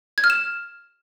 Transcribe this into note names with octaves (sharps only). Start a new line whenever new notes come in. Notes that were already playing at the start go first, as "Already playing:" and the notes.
G#6
F6
E7